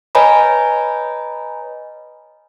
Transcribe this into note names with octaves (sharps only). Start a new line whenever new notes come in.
B4 C#5 D#5 G#5 A#5 B5